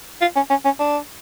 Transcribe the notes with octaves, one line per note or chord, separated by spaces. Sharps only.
F4
C#4
C#4
C#4
D4